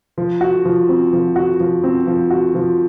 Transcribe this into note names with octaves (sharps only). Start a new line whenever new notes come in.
F3
F#4
F3
C4
F3
F#4
F3
C4
F3
F#4
F3